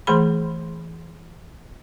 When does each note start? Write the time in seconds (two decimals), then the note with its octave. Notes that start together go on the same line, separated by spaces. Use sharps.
0.07 E3 A3 G#4 B5